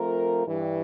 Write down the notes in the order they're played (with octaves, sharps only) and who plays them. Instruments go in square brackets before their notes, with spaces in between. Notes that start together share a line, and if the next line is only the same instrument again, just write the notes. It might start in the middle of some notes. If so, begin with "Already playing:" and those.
Already playing: [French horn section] F3 A3 C4 F4 A#4
G2 E3 G3